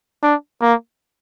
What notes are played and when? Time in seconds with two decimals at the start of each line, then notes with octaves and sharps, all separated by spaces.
0.23 D4
0.62 A#3